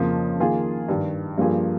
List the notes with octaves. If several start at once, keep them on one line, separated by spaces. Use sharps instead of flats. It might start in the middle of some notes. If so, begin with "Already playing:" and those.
Already playing: F2 C#3 F3 A#3
D#3 A#3 F4 G#4
G2 D#3 G3
G2 F3 A#3 F4 G#4